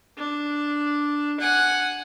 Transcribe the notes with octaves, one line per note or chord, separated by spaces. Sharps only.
D4
F#5 G#5